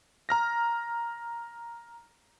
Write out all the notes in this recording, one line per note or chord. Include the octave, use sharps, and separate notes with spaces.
A#5 F6 A#6